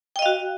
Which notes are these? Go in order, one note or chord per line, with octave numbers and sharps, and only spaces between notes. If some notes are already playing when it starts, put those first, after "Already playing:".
F#4 D#5 F5 G5